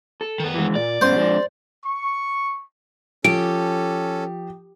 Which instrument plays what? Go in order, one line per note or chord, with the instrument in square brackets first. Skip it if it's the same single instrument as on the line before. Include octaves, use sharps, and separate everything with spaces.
[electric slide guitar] A4
[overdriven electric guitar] D#3 B3
[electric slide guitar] E3 G#3
[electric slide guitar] A#2 [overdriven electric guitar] D5
[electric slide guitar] G2 B2 C#4 [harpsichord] C5
[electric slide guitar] F2 G#3 D4
[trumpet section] C#6
[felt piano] F3 [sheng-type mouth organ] C#4 A4 [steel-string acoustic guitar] G4 [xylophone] D7